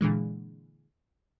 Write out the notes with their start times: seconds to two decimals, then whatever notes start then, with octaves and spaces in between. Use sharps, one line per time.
0.01 A#2 D3 E3 G#3